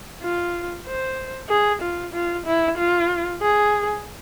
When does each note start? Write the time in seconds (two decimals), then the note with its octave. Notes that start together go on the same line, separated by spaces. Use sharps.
0.22 F4
0.86 C5
1.49 G#4
1.82 F4
2.14 F4
2.46 E4
2.78 F4
3.41 G#4